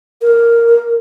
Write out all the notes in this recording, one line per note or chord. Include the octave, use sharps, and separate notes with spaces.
A#4